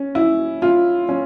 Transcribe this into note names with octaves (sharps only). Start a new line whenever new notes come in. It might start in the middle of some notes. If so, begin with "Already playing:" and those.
Already playing: C#4
E4
F4
C#4